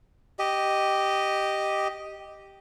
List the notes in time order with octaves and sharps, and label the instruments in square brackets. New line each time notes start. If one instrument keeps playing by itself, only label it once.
[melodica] G4 D#5